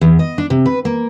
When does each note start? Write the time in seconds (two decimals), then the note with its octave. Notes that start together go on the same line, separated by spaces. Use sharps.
0.01 E2
0.19 D#5
0.38 D4
0.50 C3
0.66 B4
0.85 A#3